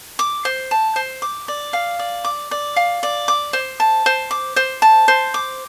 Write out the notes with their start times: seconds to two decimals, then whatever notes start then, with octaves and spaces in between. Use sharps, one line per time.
0.19 D6
0.45 C5
0.71 A5
0.96 C5
1.22 D6
1.48 D5
1.73 F5
1.99 D5
2.25 D6
2.51 D5
2.76 F5
3.03 D5
3.28 D6
3.53 C5
3.80 A5
4.06 C5
4.31 D6
4.56 C5
4.82 A5
5.08 C5
5.34 D6